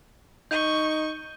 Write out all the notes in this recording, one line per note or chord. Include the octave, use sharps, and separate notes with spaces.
D#4 C#6 G6 D#7 G7